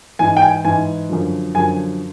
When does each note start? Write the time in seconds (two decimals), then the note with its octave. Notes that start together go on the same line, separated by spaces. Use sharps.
0.19 G#2 E3 G#5
0.37 G5
0.42 G#5
0.65 G#2 E3 G#5
1.09 F#2 D3 F3
1.55 F#2 D3 F3 G#5